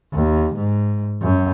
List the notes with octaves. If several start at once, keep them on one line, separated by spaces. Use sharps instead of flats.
D#2
G#2
F#2